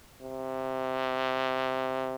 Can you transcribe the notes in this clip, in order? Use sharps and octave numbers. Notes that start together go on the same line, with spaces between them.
C3